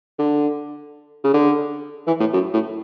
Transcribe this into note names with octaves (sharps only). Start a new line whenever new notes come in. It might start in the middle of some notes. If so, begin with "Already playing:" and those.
D3
C#3
D3
E3
A2
F#2
A2